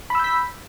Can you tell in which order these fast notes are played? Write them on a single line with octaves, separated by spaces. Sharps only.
B5 E6 G6 B6